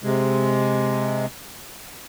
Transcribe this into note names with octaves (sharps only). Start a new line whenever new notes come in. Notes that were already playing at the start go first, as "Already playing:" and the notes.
C3 G#3